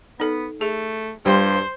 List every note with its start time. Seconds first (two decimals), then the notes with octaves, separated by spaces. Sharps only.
0.20 B3 D#4 A4
0.61 A3 G#4
1.26 G2 G3 F4 C5 G5 C6